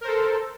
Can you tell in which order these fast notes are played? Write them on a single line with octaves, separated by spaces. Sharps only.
A#4 C5 A4